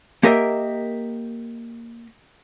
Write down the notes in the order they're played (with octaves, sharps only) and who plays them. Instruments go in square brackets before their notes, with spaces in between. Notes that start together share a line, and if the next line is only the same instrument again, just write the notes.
[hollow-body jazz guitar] A#3 G4 A#4 D#5 E5